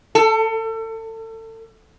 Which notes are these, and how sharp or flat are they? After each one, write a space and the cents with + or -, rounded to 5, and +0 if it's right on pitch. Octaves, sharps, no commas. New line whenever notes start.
A4 +30